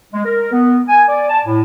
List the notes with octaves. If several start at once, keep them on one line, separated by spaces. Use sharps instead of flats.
G#3
A#4
B3
G#5
D5
A5
A2